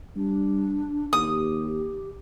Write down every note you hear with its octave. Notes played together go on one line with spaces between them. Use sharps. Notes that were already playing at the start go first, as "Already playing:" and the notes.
G3 D4
D#2 G4 D#6